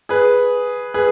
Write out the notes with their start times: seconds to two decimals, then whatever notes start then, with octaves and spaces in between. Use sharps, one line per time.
0.09 G#4 B4
0.94 G#4 B4